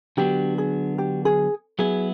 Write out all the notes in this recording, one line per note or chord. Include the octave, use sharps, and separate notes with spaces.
D3 F#3 B3 D4 F#4 G4
G#4
G4
G#4
F#3 B3 E4 G#4